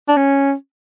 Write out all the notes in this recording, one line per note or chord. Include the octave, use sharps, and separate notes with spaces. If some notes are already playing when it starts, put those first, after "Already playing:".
D4
C#4